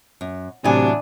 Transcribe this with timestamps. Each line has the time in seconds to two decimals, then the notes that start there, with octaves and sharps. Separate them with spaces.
0.21 F#2
0.64 E2 A2 C3 F#3 D4 G#5